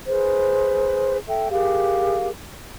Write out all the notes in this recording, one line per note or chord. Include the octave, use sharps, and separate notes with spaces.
G#4 B4 C5
A4 E5 G5
G4 G#4 A#4 F5